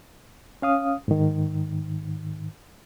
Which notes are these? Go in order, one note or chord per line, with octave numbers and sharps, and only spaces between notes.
C#4 F5 D#6
G#2 D#3